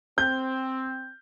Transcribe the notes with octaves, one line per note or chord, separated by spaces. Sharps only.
C4 G6